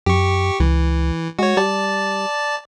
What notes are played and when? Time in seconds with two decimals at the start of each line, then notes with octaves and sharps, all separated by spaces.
0.06 F#2 G4 C#6
0.60 C#2 E3
1.39 G#3 F#4 C#5
1.57 G3 D5 A5